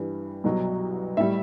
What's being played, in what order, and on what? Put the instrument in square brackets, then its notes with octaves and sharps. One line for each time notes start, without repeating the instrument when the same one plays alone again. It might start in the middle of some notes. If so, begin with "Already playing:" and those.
Already playing: [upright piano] G2 E3 G3
C2 B2 F#3
A2 G3 E5